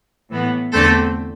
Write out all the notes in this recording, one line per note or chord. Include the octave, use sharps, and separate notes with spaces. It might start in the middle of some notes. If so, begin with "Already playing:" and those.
A2 E3 B3
E2 D3 A3 C4 A4